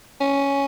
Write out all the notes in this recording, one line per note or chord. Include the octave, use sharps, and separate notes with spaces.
C#4